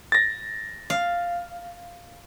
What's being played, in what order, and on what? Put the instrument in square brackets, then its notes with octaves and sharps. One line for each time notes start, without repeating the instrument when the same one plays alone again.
[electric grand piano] A6 A#6
[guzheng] F5